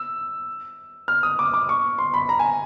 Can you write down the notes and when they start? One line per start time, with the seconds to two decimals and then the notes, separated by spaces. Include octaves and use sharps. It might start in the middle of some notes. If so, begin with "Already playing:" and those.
Already playing: E6
1.08 F6
1.23 D#6
1.39 D6
1.54 D6
1.69 C#6
1.98 C6
2.14 B5
2.29 A#5
2.39 G#5